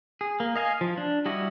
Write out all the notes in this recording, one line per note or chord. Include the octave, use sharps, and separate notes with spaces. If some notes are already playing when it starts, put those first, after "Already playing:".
G#4
A#3
D#5 F5 G#5
F3
D4
G3 E4 F#4 D#5